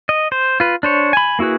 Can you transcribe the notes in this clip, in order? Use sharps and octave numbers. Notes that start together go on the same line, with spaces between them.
D#5
C5
F4 B4
D4 C5 C#5
G#5 B5
A#3 E4 F#4 G#4 B4